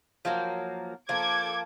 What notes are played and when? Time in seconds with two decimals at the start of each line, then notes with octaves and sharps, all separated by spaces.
0.25 F3 F#3 A#3
1.09 F3 A#3 A4 D6 G#6